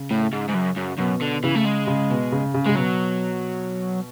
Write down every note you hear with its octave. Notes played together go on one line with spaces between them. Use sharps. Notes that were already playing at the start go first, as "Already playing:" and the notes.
Already playing: C#3
A2
G#2
G#2
F#2
F#2
F#2 B2
D3
C#3 E3
A3
G#3
C#3
B2
C#3
C#3
C#3 G#3
B2 F#3